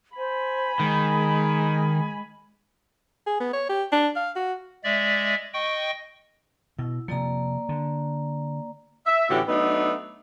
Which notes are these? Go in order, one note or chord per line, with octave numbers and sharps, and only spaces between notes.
C5 G#5 B5
D#3 G#3
G#4
B3
C#5
G4
D4
F5
F#4
G#3 D5 E5
D#5 G5 C#6
B2 E4
C3 F3 A#3 D5 A#5
D3
E5
A2 D3 E3 C#4 F#4 G4
F#3 A3 B3 D4 D#4